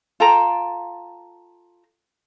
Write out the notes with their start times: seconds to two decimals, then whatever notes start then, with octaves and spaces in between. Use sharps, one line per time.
0.20 F4 A4 G5 A#5